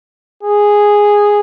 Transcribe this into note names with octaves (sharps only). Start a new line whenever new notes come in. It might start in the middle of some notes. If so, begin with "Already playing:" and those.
G#4